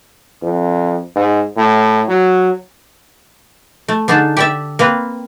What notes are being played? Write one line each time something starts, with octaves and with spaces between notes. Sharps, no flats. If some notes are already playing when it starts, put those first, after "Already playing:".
F2
G#2
A2
F#3
A3
D3 D4 D#4 G#4 A5
G4 D5 E5
A#3 C4 B4